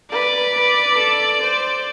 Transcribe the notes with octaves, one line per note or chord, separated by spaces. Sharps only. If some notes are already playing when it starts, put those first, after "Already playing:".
B4 D5
B4
A4
C5